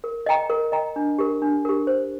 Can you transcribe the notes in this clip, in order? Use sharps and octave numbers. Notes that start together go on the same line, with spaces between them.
A#4
D#5 G5 A#5
A#4
D#5 G5 A#5
D4
G4 A#4
D4
G4 A#4
C5